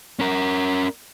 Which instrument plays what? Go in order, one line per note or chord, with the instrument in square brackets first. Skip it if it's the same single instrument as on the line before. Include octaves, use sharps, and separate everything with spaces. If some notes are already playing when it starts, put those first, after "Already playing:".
[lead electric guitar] C#4 A#4